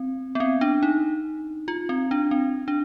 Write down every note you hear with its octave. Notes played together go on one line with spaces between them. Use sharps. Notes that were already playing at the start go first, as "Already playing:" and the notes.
Already playing: C4
B3
C4
D4
D#4
F4
C4
D4
C4
D4